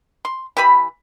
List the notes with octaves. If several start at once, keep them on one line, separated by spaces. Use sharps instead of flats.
C6
E3 G4 B4 B5